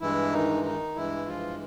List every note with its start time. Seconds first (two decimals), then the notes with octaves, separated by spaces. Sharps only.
0.01 G2 E3 G#3 E4
0.32 D#3 D#4
0.64 D#3 D#4
0.96 G2 E3 G#3 E4
1.27 F3 F4